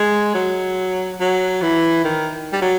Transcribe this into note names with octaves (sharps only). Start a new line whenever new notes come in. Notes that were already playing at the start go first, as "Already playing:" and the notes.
Already playing: G#3
F#3
F#3
E3
D#3
G3
F#3